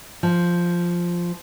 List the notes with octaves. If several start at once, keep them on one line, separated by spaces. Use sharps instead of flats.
F3